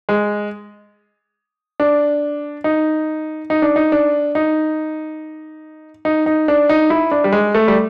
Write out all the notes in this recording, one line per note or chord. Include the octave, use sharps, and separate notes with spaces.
G#3
D4
D#4
D#4
D4
D#4
D4
D#4
D#4
D#4
D4
D#4
E4
D4
G3
G#3
A3
G3